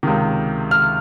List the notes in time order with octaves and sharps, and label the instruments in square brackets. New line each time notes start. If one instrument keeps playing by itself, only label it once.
[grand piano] C#2 C3 D#3
F6